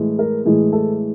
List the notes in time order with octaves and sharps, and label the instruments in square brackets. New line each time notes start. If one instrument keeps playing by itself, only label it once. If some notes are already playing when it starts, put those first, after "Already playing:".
Already playing: [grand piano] A2 E3 G#3
A#4
A2 E3 G#3 G#4
A4